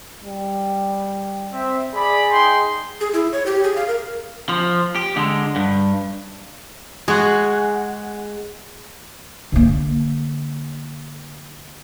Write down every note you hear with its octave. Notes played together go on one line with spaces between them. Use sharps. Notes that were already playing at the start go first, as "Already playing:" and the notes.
G3
C4 E5
G#4 D5 B5
D#4 G5 C6
G#4
E4
C#5
G4
G#4
F5
A#4
F3
G4
D3 G#3
G2
G#3 F#4 G#4
D3 A#3